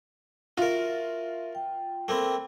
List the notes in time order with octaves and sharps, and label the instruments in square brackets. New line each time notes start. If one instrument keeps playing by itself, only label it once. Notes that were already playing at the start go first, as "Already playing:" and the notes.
[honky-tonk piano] F4 [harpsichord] F#4 A#4 [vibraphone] E5
[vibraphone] G5
[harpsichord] A3 A#3 C4 [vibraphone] G5 B5